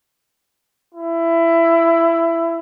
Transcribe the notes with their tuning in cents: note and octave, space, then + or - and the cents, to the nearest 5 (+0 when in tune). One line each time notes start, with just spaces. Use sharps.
E4 +20